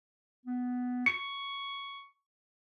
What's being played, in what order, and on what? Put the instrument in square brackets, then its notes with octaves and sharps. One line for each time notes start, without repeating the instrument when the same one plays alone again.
[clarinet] B3
[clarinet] C#6 [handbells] C#7